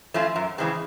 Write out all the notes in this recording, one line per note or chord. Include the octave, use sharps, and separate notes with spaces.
F3 A3 C#4 F4
F#2
C#3 E3 G#3 C4